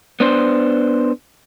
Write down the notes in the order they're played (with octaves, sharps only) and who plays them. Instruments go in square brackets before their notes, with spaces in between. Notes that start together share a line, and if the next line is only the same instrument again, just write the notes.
[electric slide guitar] B3 D4 C5